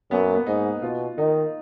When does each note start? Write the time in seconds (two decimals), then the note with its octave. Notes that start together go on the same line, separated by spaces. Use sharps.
0.11 F#2 B3
0.23 A#3
0.35 B3
0.46 G#2 D#4
0.82 B2 F4
1.18 D#3 D#4